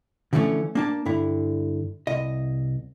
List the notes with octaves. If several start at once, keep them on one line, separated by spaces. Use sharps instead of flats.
D3 E3 F3 A3 C#4
A#3 D4 A5
G2 D3 E4
C2 D#5